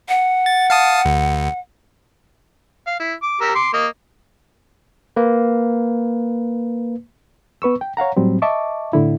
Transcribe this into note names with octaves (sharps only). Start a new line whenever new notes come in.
F#5
A6
F5 A5 D#6
D2
F5
E4
D6
G4 A#4 E6
C6 D6
A#3 D#5
A#3 B4
B3 B4 C#6 E6
G5
C#5 F5 F#5 A#5
A2 F#3 G3 C4
D#5 E5 A5 C#6 D6
A2 D3 E4